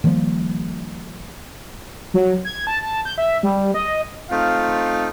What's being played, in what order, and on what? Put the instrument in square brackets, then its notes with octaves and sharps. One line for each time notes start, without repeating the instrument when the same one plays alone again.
[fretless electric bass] D#3 F3 G3 A#3
[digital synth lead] F#3
G#6
A5
A5
G6
E5
G3
D#5
[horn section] A3 C4 D#4 F4 F5